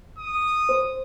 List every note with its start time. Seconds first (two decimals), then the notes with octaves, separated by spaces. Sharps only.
0.19 D#6
0.69 C5